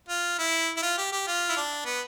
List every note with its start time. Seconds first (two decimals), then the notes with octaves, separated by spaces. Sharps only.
0.08 F4
0.39 E4
0.77 E4
0.82 F4
0.98 G4
1.12 G4
1.27 F4
1.49 E4
1.57 D4
1.85 B3